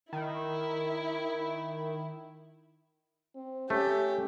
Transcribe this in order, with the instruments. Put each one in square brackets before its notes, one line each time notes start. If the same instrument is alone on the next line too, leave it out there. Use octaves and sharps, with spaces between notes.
[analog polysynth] D#3 [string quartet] E4
[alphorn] C4
[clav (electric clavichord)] A3 [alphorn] C#4 [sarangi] G4